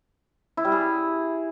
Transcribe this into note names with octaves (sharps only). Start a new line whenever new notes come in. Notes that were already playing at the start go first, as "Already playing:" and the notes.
E4
G3
G#4